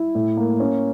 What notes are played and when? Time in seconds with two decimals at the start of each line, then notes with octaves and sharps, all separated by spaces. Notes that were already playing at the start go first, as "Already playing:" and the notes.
Already playing: E4
0.15 A2
0.37 A#3
0.60 C#4